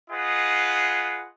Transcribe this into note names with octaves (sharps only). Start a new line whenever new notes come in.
F4 G#4 B4 D#5 F#5